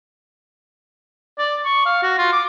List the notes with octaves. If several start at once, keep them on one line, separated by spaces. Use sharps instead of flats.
D5
C#6
F5
F#4
F4
D6